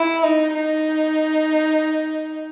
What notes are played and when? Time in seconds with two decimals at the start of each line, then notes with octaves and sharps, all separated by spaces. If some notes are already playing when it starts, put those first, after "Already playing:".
Already playing: E4
0.24 D#4
0.54 D#4